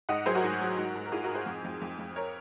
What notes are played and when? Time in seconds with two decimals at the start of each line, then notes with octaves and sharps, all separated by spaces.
0.09 G#2 D#5 F#5
0.26 F#3 G#4 C5
0.35 F#4 A#4
0.43 G#2
0.61 F#3
0.77 G#2
0.95 G#2
1.06 A#4
1.12 G#2 F4 G#4
1.24 F#4 A#4
1.29 G#2
1.35 G#4 C5
1.46 F2
1.64 F2
1.81 F2
1.99 F2
2.16 A#4 C#5